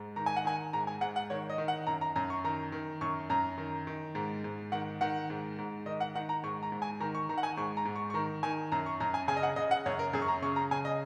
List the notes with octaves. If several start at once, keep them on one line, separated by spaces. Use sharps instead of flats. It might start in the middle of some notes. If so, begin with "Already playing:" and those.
Already playing: G#2
D#3 A#5
G#5
F#5
D#3 G#5
G#2 A#5
G#5
G#2 F#5
F#5
D#3 C#5
D#5
D#3
F#5
F#2 A#5
A#5
F#2 A#5
C#6
D#3 A#5
D#3
F#2 C#6
F#2 A#5
D#3
D#3
G#2
G#2
D#3 F#5
D#3 F#5
G#2
G#2
D#3 D#5
F#5
D#3 F#5
A#5
G#2 C#6
A#5
G#2
G#5
D#3 A#5
C#6
D#3 A#5
F#5
G#5
G#2 C#6
A#5
G#2
C#6
C#6
D#3 A#5
D#3 G#5
F#2 A#5
C#6
F#2 A#5
G#5
C#3 G#5
D#5
F#5
C#3 D#5
F#5
F#2 C#5
A#4
F#2 G#4
C#6
A#5
C#3 C#6
A#5
C#3 G#5
D#5